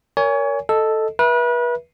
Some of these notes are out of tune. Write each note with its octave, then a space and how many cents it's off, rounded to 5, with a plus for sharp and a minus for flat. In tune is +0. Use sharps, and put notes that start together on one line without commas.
A#4 +0 C#5 +30 G#5 -10
A4 +0 D#5 +0
B4 -35 E5 +0